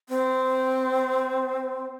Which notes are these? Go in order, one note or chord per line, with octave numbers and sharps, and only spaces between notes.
C4